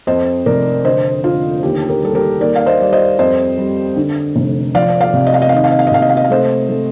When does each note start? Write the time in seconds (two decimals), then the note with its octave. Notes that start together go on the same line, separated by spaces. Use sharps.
0.07 F2 C5 D#5
0.46 F1 A#4 D5
0.85 D3 C5 D#5
1.24 D3 F4
1.63 D#2 G4
1.89 G4 A#4
2.02 G3 A4
2.15 G4 A#4
2.41 D#2 A#4 D5
2.56 F5
2.66 C5 D#5
2.80 G3 D5
2.93 C5 D#5
3.19 F2 C5 D#5
3.58 G3
3.96 D3
4.36 F1
4.75 F3 D5 F5
5.01 D5 F5
5.14 C3
5.27 D#5
5.34 F5
5.42 D#5
5.49 F5
5.53 D#3 D#5
5.64 F5
5.72 D#5
5.79 F5
5.87 D#5
5.91 C3 F5
6.02 D#5
6.09 F5
6.17 D#5
6.24 F5
6.30 A3 C5 D#5
6.69 A3